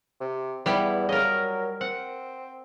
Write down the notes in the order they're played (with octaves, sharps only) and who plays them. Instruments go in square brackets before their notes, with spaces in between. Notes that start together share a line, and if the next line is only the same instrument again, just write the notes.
[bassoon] C3
[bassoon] E2 [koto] G3 B3 E4
[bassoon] C#3 [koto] A#4 D#5
[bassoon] F#3
[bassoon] C4 [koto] F#5